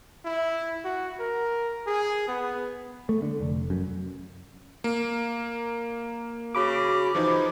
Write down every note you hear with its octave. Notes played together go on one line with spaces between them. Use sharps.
E4
F#4
A#4
G#4
B3
A3
D3
F1
F#2
A#3
C#3 F#4 B5 D6
E3 F3 D#4 C5